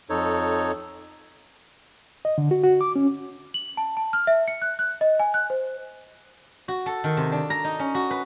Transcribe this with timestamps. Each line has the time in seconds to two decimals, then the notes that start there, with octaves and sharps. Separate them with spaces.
0.10 F2 D#4 A4 C#5
2.25 D#5
2.38 D3
2.51 F#4
2.63 F#4
2.81 D6
2.96 C#4
3.54 F#7
3.77 A5
3.97 A5
4.13 F6
4.27 E5
4.48 C#7
4.62 F#6
4.79 F#6
5.01 D#5
5.20 G#5
5.34 F#6
5.50 C5
6.68 F#4
6.86 A4
7.04 D#3
7.17 C3
7.32 D4
7.50 A#5
7.64 D#4
7.79 C#4
7.95 F#4
8.11 B4